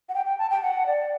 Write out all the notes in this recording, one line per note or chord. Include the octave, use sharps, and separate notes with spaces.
F#5
G5
G5
A5
G5
F#5
D5